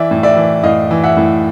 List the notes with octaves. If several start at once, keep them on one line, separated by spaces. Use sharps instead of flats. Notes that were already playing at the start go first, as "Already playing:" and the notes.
Already playing: E3 D5 E5
A2
D5 E5
E3
A2 D#5 F5
E3
E5 F#5
A2